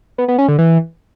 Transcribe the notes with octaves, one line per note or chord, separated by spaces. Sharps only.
B3
B3
C#4
D3
E3